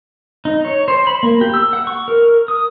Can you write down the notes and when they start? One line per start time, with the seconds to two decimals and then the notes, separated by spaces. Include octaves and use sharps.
0.45 D#4
0.65 C#5
0.88 C5
1.07 B5
1.23 A#3
1.41 G4
1.54 E6
1.73 F#5
1.87 C#6
2.08 A#4
2.48 D#6